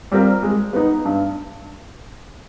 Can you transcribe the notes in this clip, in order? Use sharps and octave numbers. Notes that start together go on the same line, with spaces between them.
G3 C4 F4 A#4
G#3
B3 D#4
G2